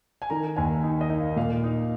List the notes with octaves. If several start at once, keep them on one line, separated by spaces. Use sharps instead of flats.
G#5
D#3 A#5
D#2 G#5
D#4
D#5
D#4
F5
A#2 F5
D#4